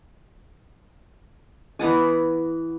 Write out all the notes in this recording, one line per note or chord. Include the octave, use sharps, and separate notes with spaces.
E3 B3 F#5 G#5